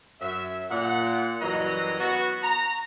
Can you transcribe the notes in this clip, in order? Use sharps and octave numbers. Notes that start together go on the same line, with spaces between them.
F#2 E5
A#2 F#5
F#2 E3 F#3 G3 D#5 A#5
B3 F#4
A#5